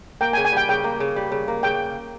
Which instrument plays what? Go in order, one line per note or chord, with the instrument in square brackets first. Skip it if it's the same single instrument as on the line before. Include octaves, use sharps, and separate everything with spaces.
[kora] A#3 [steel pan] G5
[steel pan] G#5
[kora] C#3
[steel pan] G#5
[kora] G3 [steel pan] G5
[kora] C#3 [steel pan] G5
[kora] A#3
C#3
G3
C#3
A#3
[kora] C#3 [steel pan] G5